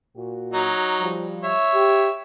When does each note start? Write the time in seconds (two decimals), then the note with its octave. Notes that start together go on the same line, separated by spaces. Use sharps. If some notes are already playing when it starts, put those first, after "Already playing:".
0.15 A#2 F#4
0.53 F#3 D#4
1.00 F3 G3
1.44 C#5 E5
1.74 G4